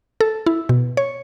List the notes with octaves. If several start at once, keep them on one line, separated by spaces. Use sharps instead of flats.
A4
E4
B2
C#5